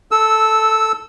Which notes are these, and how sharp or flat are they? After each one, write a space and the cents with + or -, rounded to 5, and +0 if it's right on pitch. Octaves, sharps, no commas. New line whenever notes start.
A4 +0 E6 -10